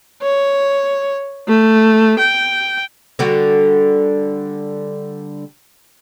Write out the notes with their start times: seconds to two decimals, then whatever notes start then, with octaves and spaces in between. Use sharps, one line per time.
0.22 C#5
1.48 A3
2.19 G5
3.19 D3 G3 F#4